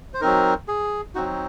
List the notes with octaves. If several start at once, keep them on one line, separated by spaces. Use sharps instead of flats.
C5
F#3 C4 D#4 A#4
G#4
F#3 C4 D#4 F#4